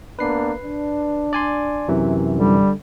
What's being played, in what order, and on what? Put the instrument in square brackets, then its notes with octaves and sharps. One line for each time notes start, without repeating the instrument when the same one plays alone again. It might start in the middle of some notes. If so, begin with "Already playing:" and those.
[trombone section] A#3 B3 D4 [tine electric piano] B4 C7
[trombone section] D4
[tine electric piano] D5 G#5 C6
F#2 C3 E3
[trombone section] D3 [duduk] G3